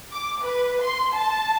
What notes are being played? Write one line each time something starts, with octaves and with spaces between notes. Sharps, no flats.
D6
B4
C6
A5